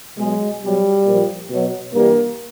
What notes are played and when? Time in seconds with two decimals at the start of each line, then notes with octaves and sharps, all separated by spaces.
0.18 B2 F#3 G#3
0.62 B2 F#3 G3
1.06 A#2 F3
1.50 B2 F#3
1.94 G2 E3 G3 A#3